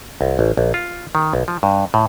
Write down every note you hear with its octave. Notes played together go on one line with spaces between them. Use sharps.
C2
A1
A#1
F4
D#3
B1
F3
G2
A2